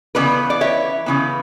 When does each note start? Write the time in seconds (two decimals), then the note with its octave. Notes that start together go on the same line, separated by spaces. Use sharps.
0.15 C#3 E3 B3 B4 D5
0.50 D5
0.61 C#5 E5
1.06 C#3 E3 B3